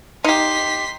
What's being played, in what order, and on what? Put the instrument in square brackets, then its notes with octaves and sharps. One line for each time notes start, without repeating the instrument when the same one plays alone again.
[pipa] D#4 G4 [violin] C6 B6